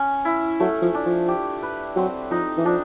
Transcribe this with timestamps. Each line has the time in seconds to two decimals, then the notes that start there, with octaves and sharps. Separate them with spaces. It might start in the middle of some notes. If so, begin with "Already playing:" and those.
Already playing: C#4
0.25 E4
0.60 F#3 A3
0.82 F3
0.94 D4
1.06 F3
1.28 G4
1.63 B4
1.96 F#3 C4
2.31 F3 D#4
2.57 E3
2.65 F3 D4